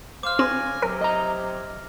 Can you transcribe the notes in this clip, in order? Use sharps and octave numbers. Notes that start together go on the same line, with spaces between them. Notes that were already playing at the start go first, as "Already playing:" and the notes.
C5 F5 D6 F6
C#3 C4 G#5 A#6
C3 F#3 A#4
D#5 A#5